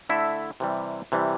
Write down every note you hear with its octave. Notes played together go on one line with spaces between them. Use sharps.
D3 A3 E4 A4 E5
C3 E3 G3
C3 E3 G3